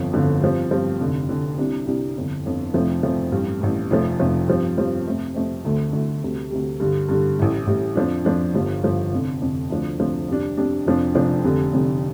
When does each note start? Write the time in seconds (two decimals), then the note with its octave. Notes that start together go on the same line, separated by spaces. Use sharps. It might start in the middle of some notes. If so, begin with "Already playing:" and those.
Already playing: G1 F2 F3
0.13 G1 F2 D3 F3
0.41 G2 F3 C4
0.71 G2 F3 C4
1.01 F1 F2 D3
1.29 F1 F2 D3
1.58 C2 C3 G3 D4
1.87 C2 C3 G3 D4
2.16 G1 F2 D3
2.45 G1 F2 D3
2.74 F1 F2 F3 A3 C4
3.03 F1 F2 F3 A3 C4
3.32 A1 G2 G3
3.61 A1 G2 G3
3.91 F1 F2 F3 A3
4.19 F1 F2 F3 A3
4.48 G2 F3 C4
4.77 G2 F3 C4
5.05 F2 C3 A3 C4
5.34 F2 C3 A3 C4
5.65 D2 D3 A3
5.93 D2 D3 A3
6.23 D2 C3 G3
6.50 D2 C3 G3
6.80 G2 D3 G3
7.09 G2 D3 G3
7.38 A1 A2 G3
7.67 A1 A2 G3
7.95 F2 F3 D4
8.25 F2 F3 D4
8.54 G1 G2 F3
8.83 G1 G2 F3
9.12 F1 F2 D3
9.41 F1 F2 D3
9.70 D2 C3 F3 D4
9.99 D2 C3 F3 D4
10.28 F2 C3 G3 D4
10.57 F2 C3 G3 D4
10.86 F1 F2 F3 D4
11.15 F1 F2 F3 D4
11.44 F1 F2 D3 G3
11.73 F1 F2 D3 G3